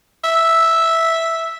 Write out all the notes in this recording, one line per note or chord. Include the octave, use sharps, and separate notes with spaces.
E5